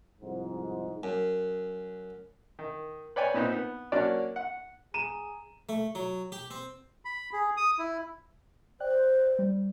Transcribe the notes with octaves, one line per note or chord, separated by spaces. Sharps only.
C2 F2 G#2
F#2
D#3
B4 C#5 D5 G5 G#5
A#2 B3 C4 D#4
B3
F#3 A#3 C#4 D4 D5
F#5
G#4 A#5 D#7 E7
A3
F#3
G4
C4
B5
G#4
D#6
E4
C5 D5 G5 F#6
G3